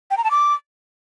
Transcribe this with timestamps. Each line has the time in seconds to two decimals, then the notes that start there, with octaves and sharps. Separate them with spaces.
0.11 G5
0.17 A#5
0.24 A5
0.31 D6